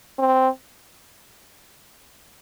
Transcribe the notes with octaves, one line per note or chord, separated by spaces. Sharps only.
C4